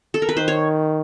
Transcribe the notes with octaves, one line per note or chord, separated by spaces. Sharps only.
A4
A#4
B4
D#3 C5
C#5